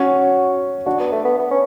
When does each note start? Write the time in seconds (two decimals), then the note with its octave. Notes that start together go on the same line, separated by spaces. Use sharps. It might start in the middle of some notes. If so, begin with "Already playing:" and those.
Already playing: C#4 F#4
0.86 D4 F#4
1.00 B3
1.12 A3
1.25 B3
1.38 B3
1.51 C#4